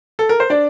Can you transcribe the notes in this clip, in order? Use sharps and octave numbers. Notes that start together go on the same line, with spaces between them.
A4
A#4
C5
D4 D5